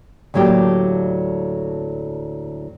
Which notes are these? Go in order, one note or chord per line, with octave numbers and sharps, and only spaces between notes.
D2 A2 F#3 A#3 G4